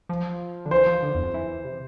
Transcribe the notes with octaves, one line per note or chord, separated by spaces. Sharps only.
F3
D3
E3 C5
F3
D3
E2
F2
E3
C3